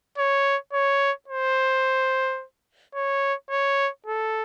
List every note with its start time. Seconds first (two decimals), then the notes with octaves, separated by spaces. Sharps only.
0.18 C#5
0.73 C#5
1.28 C5
2.95 C#5
3.50 C#5
4.06 A4